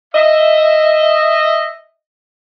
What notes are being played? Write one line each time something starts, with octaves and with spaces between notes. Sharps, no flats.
D#5 E5